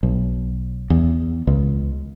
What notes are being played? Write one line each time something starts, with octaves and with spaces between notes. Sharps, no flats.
B1
E2
C#2